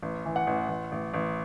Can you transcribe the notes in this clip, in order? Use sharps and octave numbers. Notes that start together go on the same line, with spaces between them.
A1
E3
F#5
A1
A1
A1
A1